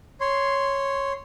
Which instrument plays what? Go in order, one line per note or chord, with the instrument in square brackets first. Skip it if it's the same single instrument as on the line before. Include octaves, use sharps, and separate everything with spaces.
[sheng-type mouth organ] C#5 C6